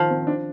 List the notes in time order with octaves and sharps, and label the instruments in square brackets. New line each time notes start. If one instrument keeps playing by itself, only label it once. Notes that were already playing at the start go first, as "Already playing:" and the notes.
Already playing: [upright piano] D#3 [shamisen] F3
[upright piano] C4
D4